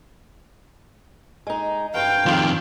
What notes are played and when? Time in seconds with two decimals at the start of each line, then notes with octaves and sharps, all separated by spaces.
1.47 G#3 D#4
1.95 G2 F5 G5
2.26 F2 A2 D#3 C4 F4